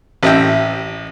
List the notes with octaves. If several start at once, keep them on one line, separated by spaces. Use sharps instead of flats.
A1 D#5 E5 G5